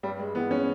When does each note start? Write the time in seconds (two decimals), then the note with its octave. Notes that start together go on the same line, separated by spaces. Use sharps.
0.03 G2 G3
0.19 G#3
0.35 E3 B3
0.51 C#4